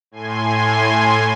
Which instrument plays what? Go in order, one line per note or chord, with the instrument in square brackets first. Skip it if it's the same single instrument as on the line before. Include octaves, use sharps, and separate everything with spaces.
[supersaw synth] A2 G#5 C6